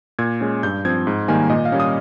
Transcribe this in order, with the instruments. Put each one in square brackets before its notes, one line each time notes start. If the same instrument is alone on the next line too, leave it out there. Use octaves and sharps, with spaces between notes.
[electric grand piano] A#2 G#6
G#3 C#4
G2 G6
F3 C4 G#6
G#2
D#3 G3 A#3 G#5
A#2 D#5
F5
G3 A#3 C#4
D#6